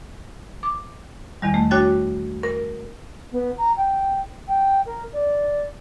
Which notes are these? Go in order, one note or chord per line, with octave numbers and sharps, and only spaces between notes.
D6
E2 D#3 G3
A3
D4 F#4 C#5 G5 A6
A#4
B3
A#5
G5
G5
A#4
D5